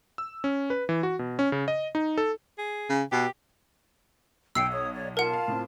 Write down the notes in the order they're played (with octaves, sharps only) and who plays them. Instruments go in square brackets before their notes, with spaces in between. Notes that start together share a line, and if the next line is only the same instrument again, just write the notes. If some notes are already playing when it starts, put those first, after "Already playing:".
[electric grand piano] E6
C#4
B4
E3
F#4
B2
C#4
C#3
D#5
D#4
A4
[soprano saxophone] G#4
[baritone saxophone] C#3
[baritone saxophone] B2 [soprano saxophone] G4
[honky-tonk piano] B1 [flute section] G5 [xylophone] E6 C7 C#7
[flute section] C#5 D#6
C#5 D5
[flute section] F4 A5 [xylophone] A#4 F#5
[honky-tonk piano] F5
A2 C4